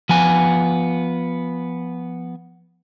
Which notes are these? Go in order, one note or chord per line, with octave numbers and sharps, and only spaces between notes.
F3 B3 G#5